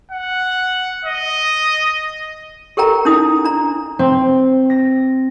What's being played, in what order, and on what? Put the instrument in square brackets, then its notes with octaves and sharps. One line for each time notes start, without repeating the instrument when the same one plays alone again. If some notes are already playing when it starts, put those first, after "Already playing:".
[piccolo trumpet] F#5
D#5
[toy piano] G4 A4 A#4 G5 A#5
C#4 D#4 E4 D#6
D4 A#5
[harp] C4
A#6